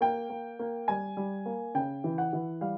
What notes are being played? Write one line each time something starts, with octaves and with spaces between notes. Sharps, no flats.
A#3 G5
A#3
A#3
G3 G#5
G3
A#3
C#3 G5
E3
F#5
E3
G3 F5